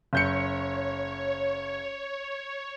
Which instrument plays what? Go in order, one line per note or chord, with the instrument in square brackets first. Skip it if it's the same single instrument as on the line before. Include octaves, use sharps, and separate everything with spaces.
[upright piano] F#1 G6 C#7 [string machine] C#5